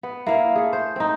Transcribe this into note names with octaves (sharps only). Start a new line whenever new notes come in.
B3
A#3 E4 F5
A3 G#4
C5
C4 D#4